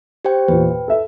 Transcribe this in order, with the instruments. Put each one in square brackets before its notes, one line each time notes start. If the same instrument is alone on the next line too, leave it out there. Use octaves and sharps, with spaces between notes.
[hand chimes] G4 C5 G5
[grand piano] E2 A#2 [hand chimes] B4
[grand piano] G5
A4 E5